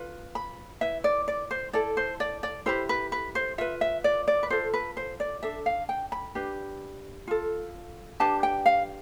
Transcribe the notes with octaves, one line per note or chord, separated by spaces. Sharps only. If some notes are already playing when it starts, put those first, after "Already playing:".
Already playing: F4 B4
B5
E4 B4 E5
D5
D5
C5
E4 A4 D5
C5
D5
D5
E4 G4 B4 C5
B4
B4
C5
F4 B4 E5
E5
D5
D5
B4
F4 A4 C5
B4
C5
D5
D4 A4 E5
F5
G5
B5
D4 G4 B4
F4 A4
D4 G4 B4 A5
G5
F5